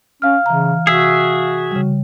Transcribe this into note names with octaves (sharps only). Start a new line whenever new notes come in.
C#4 F5 F6
C#3 E3 A#5
C3 F#4 G#4 E5
C#3 G3